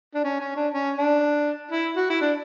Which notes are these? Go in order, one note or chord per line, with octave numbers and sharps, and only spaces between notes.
D4
C#4
C#4
D4
C#4
D4
E4
F#4
E4
D4